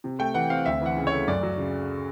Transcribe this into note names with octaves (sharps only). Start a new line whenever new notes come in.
C3
A3 G5
E3 F#5
C4 F5
D2 E5
E3 F#5
C#3
C#5
A3
F#2 D5
F#3
C#3